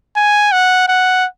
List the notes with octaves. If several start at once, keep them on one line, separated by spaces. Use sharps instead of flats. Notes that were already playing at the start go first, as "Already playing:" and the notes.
G#5
F#5
F#5